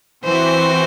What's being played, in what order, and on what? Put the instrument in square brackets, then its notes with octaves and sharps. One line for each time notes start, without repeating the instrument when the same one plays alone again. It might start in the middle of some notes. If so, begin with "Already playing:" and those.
[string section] E3 C4 F#4 [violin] C5